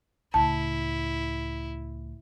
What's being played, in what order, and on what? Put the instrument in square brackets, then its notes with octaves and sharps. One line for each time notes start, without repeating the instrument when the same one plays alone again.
[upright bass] C#2 A2 [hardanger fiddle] E4 [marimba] A5